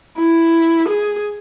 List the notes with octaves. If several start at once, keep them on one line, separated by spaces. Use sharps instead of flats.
E4
G#4